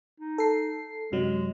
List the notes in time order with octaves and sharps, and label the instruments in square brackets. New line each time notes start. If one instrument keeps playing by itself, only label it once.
[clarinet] D#4
[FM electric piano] A4 C7
[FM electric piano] F#2 C3 F#3 [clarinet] G#3